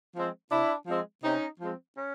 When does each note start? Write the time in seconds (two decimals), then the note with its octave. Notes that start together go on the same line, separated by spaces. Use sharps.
0.15 F3 G#3 C4
0.50 C3 D4 E4
0.87 F3 G#3 C4
1.23 C3 C#4 D#4
1.59 F3 G#3 C4
1.96 C#4